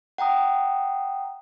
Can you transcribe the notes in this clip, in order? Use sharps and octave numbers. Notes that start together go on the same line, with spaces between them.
F#5 G5 A#5 D#6